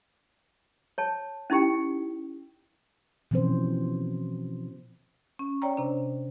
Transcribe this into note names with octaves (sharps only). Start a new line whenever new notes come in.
C#5 A5
C#4 D#4 E4 G4 G5
B2 E3 F3 C4 C#4 C5
C#4
C#5 D5 G5 A#5
C3 D4